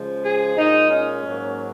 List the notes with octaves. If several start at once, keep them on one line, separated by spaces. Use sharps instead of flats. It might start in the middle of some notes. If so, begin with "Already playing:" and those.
Already playing: C#3 F3 G#3
G#4
A#2 G#3 D#4
C#4
G#2 F#3 A#3